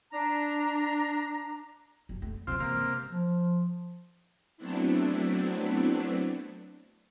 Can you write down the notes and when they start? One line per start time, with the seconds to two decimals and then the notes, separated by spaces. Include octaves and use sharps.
0.11 D4 A#5
2.09 F#1
2.22 A3
2.47 C#3 E3 C4 F4
2.60 C3 A#3 F6
2.74 G#3
3.09 F3
4.57 F#3 A3 B3 C4 D4 E4